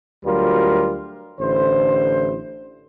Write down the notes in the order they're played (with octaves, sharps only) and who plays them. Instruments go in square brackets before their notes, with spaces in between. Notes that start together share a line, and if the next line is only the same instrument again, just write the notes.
[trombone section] D2 F#3 G3 F4 A#4
A1 D3 E4 C5